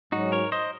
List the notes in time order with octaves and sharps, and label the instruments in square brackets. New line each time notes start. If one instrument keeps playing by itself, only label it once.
[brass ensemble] G#2 F#3 C#4 [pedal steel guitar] D#4 F#4
[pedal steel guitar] A#4 C#5
C5 D#5